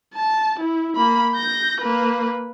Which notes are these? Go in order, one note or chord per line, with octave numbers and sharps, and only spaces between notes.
A5
E4
A#3 B5
G6 A#6
A#3 B4